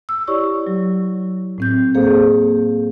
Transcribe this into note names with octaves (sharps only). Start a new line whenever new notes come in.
E6
E4 G4 C#5 D5 C#6
F#3
A2 C4 G6
A#3 G#4 A4 C5 F5